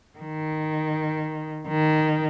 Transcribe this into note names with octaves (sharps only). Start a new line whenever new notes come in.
D#3
D#3